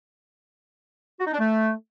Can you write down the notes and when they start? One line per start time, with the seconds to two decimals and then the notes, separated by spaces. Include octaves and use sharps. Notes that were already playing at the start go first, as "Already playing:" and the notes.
1.19 F#4
1.26 D#4
1.32 D4
1.39 A3